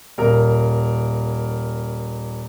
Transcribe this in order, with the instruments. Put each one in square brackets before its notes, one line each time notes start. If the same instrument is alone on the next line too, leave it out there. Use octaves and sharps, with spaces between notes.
[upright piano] D#1 A#4